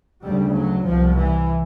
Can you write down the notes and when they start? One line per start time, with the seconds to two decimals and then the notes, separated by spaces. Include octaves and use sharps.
0.24 D2 C#3 G3
0.55 F#3
0.85 C2 B2 F3
1.16 E3